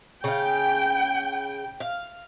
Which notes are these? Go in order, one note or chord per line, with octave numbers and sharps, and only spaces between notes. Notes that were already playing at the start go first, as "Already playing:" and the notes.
C#3 F5 G5
F5